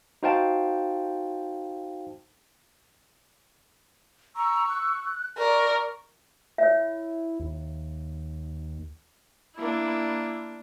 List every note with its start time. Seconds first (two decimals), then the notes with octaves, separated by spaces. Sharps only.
0.23 D#4 F#4 C5 F5 G5 A5
4.36 A#5 C#6 E6
4.69 F#6
5.38 A#4 D5 C#6
6.58 E4 C#5 E5
7.40 D#2
9.57 A#3 D4 E4